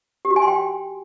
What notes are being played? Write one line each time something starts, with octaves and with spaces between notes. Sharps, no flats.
G4
F#4
G#5
C6
G5